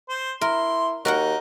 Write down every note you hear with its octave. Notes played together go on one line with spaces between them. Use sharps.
C5
E4 A#4 C6
D#2 D#4 F#4 A#4 F#5